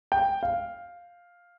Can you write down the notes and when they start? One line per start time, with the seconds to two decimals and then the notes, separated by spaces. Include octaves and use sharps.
0.12 G5
0.43 F5